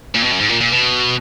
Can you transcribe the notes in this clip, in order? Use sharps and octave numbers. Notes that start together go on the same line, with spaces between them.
A#2
B2
F#2
G#2
A#2
A#2
B2